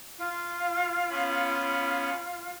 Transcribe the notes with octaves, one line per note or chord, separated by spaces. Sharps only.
F4
B3 C#4 B5